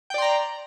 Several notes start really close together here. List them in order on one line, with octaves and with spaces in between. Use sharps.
G5 D5 C6 A#5